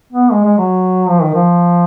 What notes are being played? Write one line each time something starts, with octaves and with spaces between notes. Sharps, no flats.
B3
G#3
G#3
F#3
F3
D#3
F3